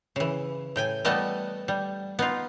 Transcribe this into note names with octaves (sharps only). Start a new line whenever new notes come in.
C#3 E3
A2 G5 G#5
E3 G3 A3 B3 D#5 A5
G3
B3 D#4 F4